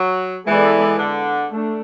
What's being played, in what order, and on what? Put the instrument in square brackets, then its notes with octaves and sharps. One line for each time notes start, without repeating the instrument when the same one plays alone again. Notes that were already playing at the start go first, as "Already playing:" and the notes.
Already playing: [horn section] F#3
[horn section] E3 [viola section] G#3 B3 E4 A4 D5
[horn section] D3
[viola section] A3 D4